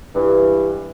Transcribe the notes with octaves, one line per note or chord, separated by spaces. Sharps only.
G2 E3